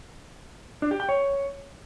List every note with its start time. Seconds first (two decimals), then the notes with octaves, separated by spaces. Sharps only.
0.82 D4
0.91 G4
1.00 G5
1.09 C#5